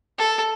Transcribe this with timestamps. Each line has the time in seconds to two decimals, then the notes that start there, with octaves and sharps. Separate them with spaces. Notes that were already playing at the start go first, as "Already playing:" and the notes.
0.18 A4